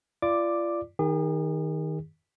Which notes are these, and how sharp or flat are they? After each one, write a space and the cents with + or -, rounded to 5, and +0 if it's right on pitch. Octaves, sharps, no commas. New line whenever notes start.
F4 -35 D5 +0 D6 +5
D#3 +10 G#4 -40